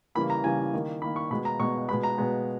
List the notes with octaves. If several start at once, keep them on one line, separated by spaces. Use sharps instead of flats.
C#3 E3 G3 A#3 B5
A#5
C#3 E3 G3 A#3 G#5
D#3 A#3
D#3 A#3 B5
C#6
B2 G#3 B3 B5
A#5
B2 G#3 B3 C#6
B2 G#3 B3 B5
A#5
B2 G#3 B3